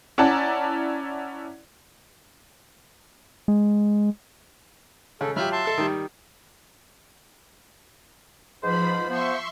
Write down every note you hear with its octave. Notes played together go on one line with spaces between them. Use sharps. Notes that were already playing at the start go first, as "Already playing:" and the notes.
C#4 E4 D5 F#5 A5 A#5
G#3
C#3 A4
F#3 F4 G4 E5 B5 F6
E5 A5 C6
A4 E6
D#3 G3
G#2 F3 B4 C5 B5
F3 B3 C5 E5 C6 C#6